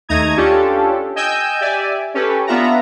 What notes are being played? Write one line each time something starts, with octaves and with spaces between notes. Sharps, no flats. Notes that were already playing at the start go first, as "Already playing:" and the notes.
D#2 A3 D#4 A#5 D#6 G#6
C#4 D4 F4 G4 A4
D#5 G5 G#5 E6 G6
G4 D5 E5 G#5
C#4 G4 A4 B4
B3 D4 F4 E5 F#5 A#5